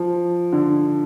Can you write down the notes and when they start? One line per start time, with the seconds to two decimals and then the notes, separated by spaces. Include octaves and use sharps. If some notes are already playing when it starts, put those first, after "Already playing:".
Already playing: F3
0.53 D3